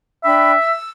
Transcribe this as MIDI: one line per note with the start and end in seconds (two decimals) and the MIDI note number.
0.24 0.51 62
0.24 0.72 76
0.24 0.51 79
0.24 0.51 83
0.58 0.88 88